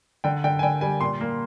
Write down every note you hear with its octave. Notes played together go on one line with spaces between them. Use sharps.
D3 G5
D3 G5
G#5
D3 G5
G3 G#5
A#2 C6
A#3